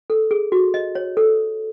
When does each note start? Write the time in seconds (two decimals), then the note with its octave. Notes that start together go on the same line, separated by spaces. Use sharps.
0.10 A4
0.31 G#4
0.52 F#4
0.74 D#5
0.95 C#5
1.17 A4